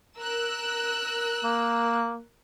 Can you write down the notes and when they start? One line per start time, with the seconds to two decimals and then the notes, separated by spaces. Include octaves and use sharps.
0.17 A#4 E6 F#6
1.44 A#3